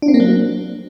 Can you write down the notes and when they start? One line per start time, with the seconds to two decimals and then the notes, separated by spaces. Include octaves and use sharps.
0.02 D4
0.08 C4
0.14 A#3
0.20 F#3